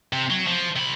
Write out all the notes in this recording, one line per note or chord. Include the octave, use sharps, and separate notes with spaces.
C3
F#3
F3
C3 B5